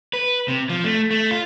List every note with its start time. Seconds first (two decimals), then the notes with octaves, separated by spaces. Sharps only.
0.13 B4
0.48 C3
0.70 F3
0.84 A3
1.11 A3
1.31 F4